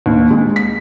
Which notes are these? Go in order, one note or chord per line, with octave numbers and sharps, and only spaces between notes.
D#2
G#3
B6